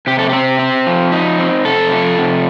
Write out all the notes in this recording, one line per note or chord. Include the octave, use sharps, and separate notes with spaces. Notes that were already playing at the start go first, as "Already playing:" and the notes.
C3 G4
A4
C4 G4
C4
F3
D#4
C4
C3 A4
F3
C3